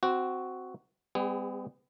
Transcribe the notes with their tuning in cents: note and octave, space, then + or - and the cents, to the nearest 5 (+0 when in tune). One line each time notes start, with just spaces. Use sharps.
C4 -10 F#4 +0
G3 +35 B3 +45 G#4 -25